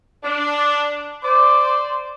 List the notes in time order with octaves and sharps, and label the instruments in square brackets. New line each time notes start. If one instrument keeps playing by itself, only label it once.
[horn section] D4
[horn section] C5 D5 [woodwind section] D6